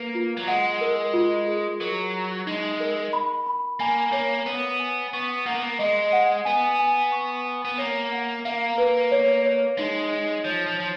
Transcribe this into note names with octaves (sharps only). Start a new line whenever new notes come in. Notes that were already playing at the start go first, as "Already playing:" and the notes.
Already playing: A#3 B4
F4
F#3
G#3 F#5
A#4
F4
G#4
F#3 A#4
A#5
G#3 D#4
A#4
B5
B5
A#3 G#5
A#3 C#5
B3 C#5
G#5
B3 C#6
A#3 F#5
B3
A#3
G#3 D#5
F#5
B3 G#5
G#5
C#6
G#5
B3
A#3 C#5
F#5
A#3 F5
B4
C#5
C#5
G#3 D#4
D#4
F3 C#5
F3
F3 C#5